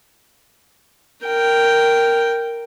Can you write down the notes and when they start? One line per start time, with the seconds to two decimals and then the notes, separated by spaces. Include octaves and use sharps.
1.24 A#4 G5